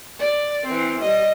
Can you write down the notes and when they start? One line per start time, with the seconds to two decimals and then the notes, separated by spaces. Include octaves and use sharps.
0.20 D5
0.66 E3 C4
1.01 G3 D#5